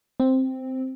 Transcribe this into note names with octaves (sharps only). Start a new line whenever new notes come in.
C4